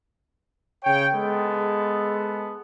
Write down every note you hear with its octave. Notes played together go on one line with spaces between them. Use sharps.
C#3 C#5 G5
G#3 B3 A4